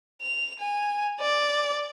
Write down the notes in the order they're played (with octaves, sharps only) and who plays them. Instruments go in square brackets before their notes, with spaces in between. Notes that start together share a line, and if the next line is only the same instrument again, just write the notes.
[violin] F7
G#5
D5